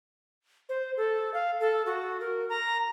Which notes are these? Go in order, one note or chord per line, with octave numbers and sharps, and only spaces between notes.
C5
A4
F5
A4
F#4
A#4
A#5